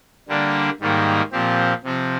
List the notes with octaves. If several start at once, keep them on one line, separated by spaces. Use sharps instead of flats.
D3 G3 A#3 D4
G#2 D#3 G3 A#3
A#2 F3 C4 G4
C3 F3 C4 F4